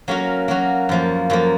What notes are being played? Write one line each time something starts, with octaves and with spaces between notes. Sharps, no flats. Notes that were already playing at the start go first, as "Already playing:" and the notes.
F#3 A#3 C#4 F#4 A#4
F#3 A#3 C#4 F#4 A#4
F#2 F3 A#3
F#2 F3 A#3